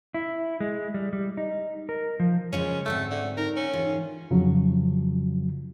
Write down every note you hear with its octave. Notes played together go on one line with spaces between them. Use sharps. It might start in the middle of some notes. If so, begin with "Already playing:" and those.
E4
G#3
G3
G3
D#4
A#4
F3
C#3 F3 G#3 C#4
D2 G#2 A3 C4
D3
D#4 A#4
C#4
G#2 E3 F4
F2 C#3 F3 F#3